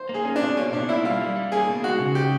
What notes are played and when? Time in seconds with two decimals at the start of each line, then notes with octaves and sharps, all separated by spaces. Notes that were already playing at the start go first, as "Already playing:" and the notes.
Already playing: C5
0.09 A#3
0.14 G#4
0.25 C#4
0.36 D4
0.42 B2
0.57 A#3 C#4
0.73 B2 D4
0.89 A#3 E4
1.04 G3 F4
1.21 G3
1.36 G3
1.52 A#3 G#4
1.68 B2
1.84 G#3 F#4
2.00 C#3
2.15 G4